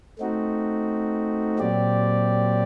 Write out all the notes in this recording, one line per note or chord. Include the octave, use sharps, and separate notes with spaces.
A3 C4 D#4 F#4
A#2 F#3 C4 G4 D5